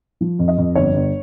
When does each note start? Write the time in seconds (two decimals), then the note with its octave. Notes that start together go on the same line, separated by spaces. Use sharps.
0.21 F3
0.39 F2
0.48 D#5
0.58 F2
0.75 G1 C#5
0.94 G1